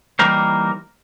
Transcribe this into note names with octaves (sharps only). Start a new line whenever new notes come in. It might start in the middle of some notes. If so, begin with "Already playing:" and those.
E3 G3 A#3 D#4 A#4 C5